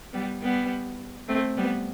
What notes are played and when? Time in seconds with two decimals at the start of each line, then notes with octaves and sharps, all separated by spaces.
0.13 G3 B3
0.42 G3 B3
1.28 A3 C4
1.57 G3 B3